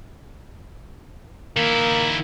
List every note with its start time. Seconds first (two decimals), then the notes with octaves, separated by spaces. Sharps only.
1.57 D#3 A#3 E4